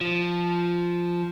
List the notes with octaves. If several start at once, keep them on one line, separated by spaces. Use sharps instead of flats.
F3